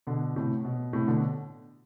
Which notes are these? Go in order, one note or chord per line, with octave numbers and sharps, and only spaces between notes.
B2 D3
A2 C3
B2
A2 C3
B2 D3